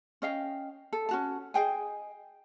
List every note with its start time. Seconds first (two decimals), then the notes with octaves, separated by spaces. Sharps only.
0.22 C#4 D#5 F5 G5
0.93 A4
1.09 C#4 F#4 A5
1.54 G#4 D#5 G5 G#5